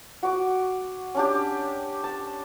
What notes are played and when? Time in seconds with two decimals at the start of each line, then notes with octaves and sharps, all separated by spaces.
0.23 F#4 D6
1.15 C#4 D4 G4
2.04 A5